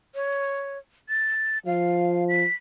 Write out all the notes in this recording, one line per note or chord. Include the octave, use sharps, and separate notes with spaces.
C#5
A6
F3 F5
B6